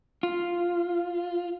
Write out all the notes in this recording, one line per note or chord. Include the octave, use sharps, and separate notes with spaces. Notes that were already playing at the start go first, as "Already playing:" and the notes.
F4